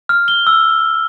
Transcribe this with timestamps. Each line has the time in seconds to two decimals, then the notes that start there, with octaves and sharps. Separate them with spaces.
0.09 F6
0.28 G7
0.47 E6